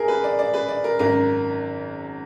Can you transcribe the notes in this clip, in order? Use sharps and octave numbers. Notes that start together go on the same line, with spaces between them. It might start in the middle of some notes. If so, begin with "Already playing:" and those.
Already playing: G#1 G#4 A#4
B4
D5
D5
B4
D5
A#4
G#1 F#2 D#3 A#4